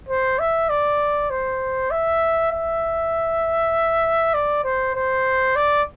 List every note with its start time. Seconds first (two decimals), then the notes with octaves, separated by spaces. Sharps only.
0.09 C5
0.39 E5
0.70 D5
1.31 C5
1.91 E5
2.52 E5
4.34 D5
4.64 C5
4.95 C5
5.56 D5